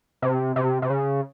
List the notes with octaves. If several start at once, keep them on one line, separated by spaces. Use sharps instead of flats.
C3
C3
C3
C#3